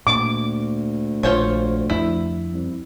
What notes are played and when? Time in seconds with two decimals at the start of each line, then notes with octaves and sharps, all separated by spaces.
0.07 D2 A#2 D6
1.23 A#1 F4 C5 C#5
1.90 F2 E4
2.52 C2